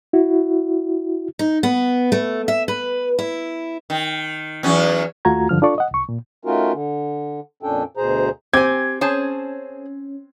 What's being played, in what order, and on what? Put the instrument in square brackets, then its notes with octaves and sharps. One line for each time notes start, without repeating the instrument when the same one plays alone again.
[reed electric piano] E4 F#4
[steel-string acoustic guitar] D#4
B3
A3
E5
B4
E4
[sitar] D#3
E2 F#3 C#4
[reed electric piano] D#2 A3 F4 F#4 A#5 G#6
G2 D3 F3 F6
D4 F4 A4 D5 C#6
D#5 F#5
C2 C#6
A#2
[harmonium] A3 C#4 D#4 F4 F#4 A#4
D3
F2 A#2 C#4 D4 A4 G5
D2 B2 G#4 C5 A#5
[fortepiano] C4 [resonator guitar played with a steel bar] G4 G#5 [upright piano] G#6
[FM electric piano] C#4 [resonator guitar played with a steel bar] G#4 C5 A5